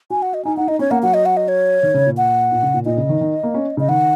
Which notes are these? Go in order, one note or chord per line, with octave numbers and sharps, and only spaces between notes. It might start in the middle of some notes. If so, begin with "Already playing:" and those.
F#4 G#5
F#5
D#5
D#4 G#5
D#4 F#5
D#4 D#5
C#4 C#5
A#3 F#5
F#3 F#5
D#5
F#5
D#5
C#5
D#3
C#3
A#2
F#5
A#2
C#3
A#2
A#2 D#5
C#3
D#3
D#3
A#3
C#4
C#3 D#5
D#3 F#5